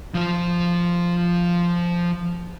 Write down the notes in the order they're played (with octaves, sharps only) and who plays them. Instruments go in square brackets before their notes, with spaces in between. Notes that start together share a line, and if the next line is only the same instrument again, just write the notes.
[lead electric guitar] F3 C5